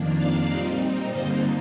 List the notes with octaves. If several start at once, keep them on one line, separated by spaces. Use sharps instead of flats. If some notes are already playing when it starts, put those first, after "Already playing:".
Already playing: F2 D#3 A#3 D4
D5 F5
A#2 G3 C4 D#4
G2 D3 G3 A#3 D#4 C5 D#5